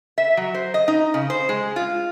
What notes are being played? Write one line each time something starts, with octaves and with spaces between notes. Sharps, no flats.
E5
F#3
C5
D#5
D#4
C#3
C5
G#3
F4